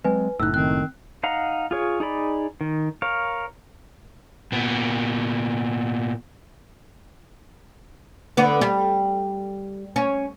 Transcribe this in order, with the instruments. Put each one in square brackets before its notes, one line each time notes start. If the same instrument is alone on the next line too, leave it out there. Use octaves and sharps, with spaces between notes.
[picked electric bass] F#3 G#3 C4 [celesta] B4 G#5
[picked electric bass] F#1 A2 [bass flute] D#4 [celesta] E6 F#6
[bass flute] D#3 [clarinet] C4 [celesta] F#6
[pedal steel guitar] D#4 F5 F#5 A#5
F4 G#4 C#5
D#4 G#4 D5 B5
D#3
A#4 C#5 F5
[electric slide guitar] A#2 B3
[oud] D3 B3
G3
C#4